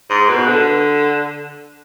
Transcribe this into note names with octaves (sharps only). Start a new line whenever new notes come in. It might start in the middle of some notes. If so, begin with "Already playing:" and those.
G#2
B2
D3